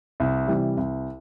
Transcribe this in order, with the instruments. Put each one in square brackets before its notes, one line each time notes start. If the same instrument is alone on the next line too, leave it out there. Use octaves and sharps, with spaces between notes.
[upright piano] C2
C3 E3 G3
C2